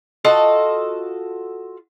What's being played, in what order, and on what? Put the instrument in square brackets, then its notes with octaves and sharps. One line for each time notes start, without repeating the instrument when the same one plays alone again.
[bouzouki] F4 F#4 A4 D#5